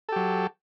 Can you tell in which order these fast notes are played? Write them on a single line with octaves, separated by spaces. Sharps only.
A4 G4 F#3